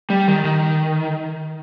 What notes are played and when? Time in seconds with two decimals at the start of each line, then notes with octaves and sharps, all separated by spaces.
0.10 G3
0.28 D#3
0.45 D#3